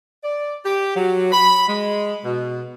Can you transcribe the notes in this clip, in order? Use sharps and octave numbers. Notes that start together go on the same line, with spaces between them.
D5
G4
F#3
B5
G#3
B2